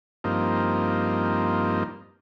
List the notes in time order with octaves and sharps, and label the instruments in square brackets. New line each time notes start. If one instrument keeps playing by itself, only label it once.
[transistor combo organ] G2 F3 A#3 C4 D#4